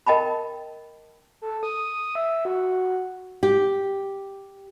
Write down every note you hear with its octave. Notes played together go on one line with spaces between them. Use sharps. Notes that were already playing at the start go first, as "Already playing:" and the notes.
A#4 D#5 G5 A5 B5
A4
D#6
E5
F#4
G4